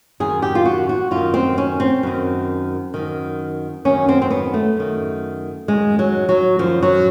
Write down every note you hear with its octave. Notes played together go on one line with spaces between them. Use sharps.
F#2 D#3 G#4
G4
F4
F#4
F#4
F#2 D#3 F4
C4
C#4
C4
F#2 D#3
F#2 D#3
F#2 D#3 C#4
C4
C4
B3
A3
F#2 D#3
F#2 D#3 G#3
F#3
F#3
F#2 D#3 F3
F#3